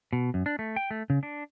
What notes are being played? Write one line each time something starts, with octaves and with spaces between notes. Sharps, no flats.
B2
F#2
D4
A3
G5
A3
C#3
D4